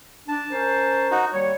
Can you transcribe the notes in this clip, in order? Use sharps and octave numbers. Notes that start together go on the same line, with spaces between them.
D4 A5
C#4 A#4 C5
D#4 F#4
D#2 G3 C#5